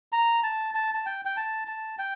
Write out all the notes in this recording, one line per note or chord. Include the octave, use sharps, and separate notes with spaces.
A#5
A5
A5
A5
G5
G5
A5
A5
G5